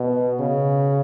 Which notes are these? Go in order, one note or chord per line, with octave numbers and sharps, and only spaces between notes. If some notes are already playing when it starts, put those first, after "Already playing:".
Already playing: B2
C#3